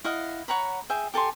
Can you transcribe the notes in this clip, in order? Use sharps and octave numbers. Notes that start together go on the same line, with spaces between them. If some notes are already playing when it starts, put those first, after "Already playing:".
E4 D#5 F5 F#5
C#5 F#5 A#5 B5
G#4 E5 G5
G4 A4 G#5 C6